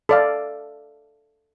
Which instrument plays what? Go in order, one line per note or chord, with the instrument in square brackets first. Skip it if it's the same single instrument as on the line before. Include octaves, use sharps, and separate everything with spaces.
[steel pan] A4 D5 F5